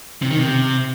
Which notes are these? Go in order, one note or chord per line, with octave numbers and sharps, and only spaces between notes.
C3
D#3
C3